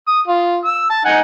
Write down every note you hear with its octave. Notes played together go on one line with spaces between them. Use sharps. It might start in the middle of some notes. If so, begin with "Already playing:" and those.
D#6
F4
E6
A5
D#4 F#5 G#5